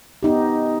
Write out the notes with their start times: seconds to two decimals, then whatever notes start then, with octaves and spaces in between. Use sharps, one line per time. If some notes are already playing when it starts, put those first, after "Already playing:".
0.23 B3 D#4 G4